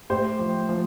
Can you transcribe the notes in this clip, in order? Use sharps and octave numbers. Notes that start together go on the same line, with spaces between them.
A2 G4 C5
F3
F3